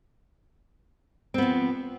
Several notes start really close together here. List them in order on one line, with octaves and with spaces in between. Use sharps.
C4 B3 F3